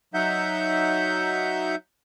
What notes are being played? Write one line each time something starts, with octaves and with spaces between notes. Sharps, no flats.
F#3 D#4 E5 F#5 G6